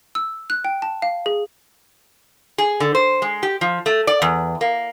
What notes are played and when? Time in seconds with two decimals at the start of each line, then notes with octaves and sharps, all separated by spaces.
0.15 E6
0.50 F#6
0.65 G5
0.82 A5
1.02 F5
1.26 G#4
2.58 G#4
2.80 D3
2.95 C5
3.22 G#3
3.43 G4
3.61 F3
3.86 A3
4.07 D5
4.22 E2
4.61 A#3